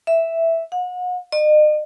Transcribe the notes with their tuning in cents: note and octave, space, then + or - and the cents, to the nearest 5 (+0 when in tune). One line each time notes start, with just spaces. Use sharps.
E5 +0
F#5 -35
D#5 -40